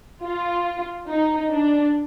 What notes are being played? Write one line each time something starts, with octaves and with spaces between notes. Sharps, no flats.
F4
D#4
D4